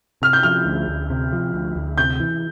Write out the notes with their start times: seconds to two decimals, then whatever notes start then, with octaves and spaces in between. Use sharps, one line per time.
0.22 C3 F6
0.33 G6
0.43 F3 F6
0.66 D2
0.88 D2
1.10 C3
1.33 F3
1.54 D2
1.76 D2
1.98 C3 G6
2.20 E3